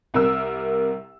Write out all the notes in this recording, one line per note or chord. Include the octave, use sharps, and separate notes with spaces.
C2 C3 A#4 E6